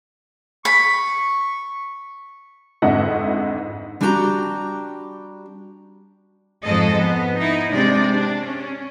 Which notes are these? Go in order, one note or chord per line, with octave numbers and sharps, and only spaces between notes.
B5 C#6
G1 F2 G#2 D#5 E5 F#5
G3 D4 F#4 G4 A5 A#5
F2 G#2 G#3 A4 D#5
B3
D#4 E4
C3 G#3 D4 D5
D4
C#4